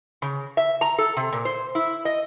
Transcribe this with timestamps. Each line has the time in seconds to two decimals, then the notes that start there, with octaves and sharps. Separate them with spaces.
0.22 C#3
0.57 E5
0.81 A#5
0.98 A4
1.17 C3
1.32 A#2
1.45 C5
1.75 E4
2.05 D#5